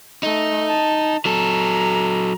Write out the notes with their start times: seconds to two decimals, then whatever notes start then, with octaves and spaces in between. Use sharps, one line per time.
0.23 A3 D#4
0.69 A5
1.25 F#3 A4 A#5